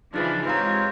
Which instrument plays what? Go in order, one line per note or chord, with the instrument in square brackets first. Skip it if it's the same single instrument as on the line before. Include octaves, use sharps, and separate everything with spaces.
[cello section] C#3 E3 [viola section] F3 [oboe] D4 [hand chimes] D#4 G#4 B4
[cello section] G#2 [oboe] C4 [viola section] F4 G4 C#5 [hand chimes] B4 F5 A#5